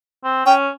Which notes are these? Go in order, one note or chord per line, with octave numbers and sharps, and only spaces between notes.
C4
C#4 G5